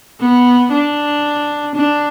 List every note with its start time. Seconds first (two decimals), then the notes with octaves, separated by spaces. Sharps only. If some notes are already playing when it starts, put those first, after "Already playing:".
0.20 B3
0.71 D4
1.75 D4